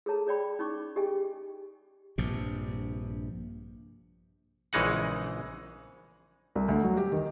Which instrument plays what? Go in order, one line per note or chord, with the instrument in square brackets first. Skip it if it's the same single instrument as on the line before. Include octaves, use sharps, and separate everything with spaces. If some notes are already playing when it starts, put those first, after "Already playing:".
[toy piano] G#4 A4 C#5 A5 A#5
G#4 C#5 D5 G5 B5
C#4 D#4 C#6 D6
G4 G#4 D#5 G5 G#5
[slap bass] A#1 G2 C3
[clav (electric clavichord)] A#1 C#3 E3 G#3 D#4 F#5
[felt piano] C2
D2
F#3
G4
D#3